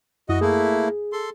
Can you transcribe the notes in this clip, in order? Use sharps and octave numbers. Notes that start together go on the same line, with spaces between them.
F#2 E4 F#4 D#5 D#6
A3 A#3 E4 G#4
A4 C6